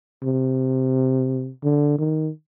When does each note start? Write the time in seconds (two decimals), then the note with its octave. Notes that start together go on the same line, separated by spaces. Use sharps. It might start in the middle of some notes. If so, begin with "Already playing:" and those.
0.23 C3
1.64 D3
1.99 D#3